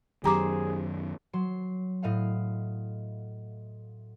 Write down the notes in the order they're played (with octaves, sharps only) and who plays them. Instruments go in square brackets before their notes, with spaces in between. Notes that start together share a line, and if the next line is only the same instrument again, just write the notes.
[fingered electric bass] F#2 D#3 [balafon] F#3 A#5 D6 [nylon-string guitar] G4 C5 [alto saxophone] G#4
[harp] F#3 C6
A2 D#5 F5 F#5